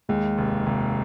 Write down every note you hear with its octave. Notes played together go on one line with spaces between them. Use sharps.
D#2 G#3 G#4
F1
F1